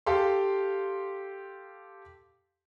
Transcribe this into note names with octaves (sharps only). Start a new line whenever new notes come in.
G4 A4 F5 C6